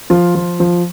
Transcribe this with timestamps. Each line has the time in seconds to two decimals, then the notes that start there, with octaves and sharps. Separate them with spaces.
0.10 F3 F4
0.35 F3
0.60 F3